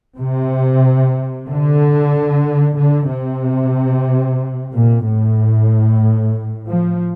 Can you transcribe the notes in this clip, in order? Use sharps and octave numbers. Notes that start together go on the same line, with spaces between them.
C3
D3
D3
C3
A#2
A2
F3